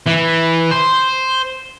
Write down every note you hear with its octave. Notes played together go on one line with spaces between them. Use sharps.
E3
C5